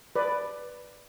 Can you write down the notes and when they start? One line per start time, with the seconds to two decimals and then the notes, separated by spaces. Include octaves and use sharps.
0.16 B4 D5